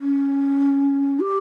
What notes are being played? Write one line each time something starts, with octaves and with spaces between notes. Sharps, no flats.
C#4
G4